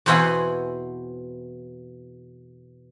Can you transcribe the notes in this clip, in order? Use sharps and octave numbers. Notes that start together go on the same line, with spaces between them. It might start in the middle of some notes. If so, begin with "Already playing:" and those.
E2 B2 C4 E4 F#5 G#5